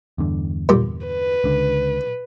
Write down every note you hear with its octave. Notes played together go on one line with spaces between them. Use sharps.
E2 G2 D3
A#2 G3 G4
B4
C#2 D3